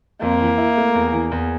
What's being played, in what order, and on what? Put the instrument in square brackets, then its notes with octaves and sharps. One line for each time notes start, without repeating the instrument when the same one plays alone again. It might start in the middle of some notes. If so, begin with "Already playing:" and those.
[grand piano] F2 [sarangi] A#3
[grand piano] E3
E4
A3
E2
E3
E2